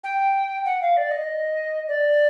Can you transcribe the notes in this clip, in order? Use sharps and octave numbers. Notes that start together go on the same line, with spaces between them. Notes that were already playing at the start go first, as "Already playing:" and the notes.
G5
F#5
F5
D5
D#5
D5